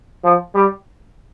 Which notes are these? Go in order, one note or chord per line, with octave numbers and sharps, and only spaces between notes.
F3
G3